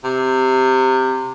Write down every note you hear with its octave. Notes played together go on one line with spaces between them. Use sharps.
C3